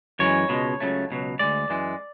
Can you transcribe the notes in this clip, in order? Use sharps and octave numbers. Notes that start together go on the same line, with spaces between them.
F#2 E3 G#3 C#5
C#2 B2 G#3
C#2 C#3 F#3 A3
C#2 B2 F#3
D2 C#3 G#3 D5
F#2 E3 G#3